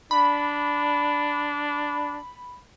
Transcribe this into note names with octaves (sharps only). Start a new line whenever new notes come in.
D4 B5